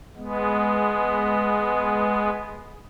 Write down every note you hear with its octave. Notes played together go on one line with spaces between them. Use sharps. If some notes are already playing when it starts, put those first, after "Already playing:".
G#3 B3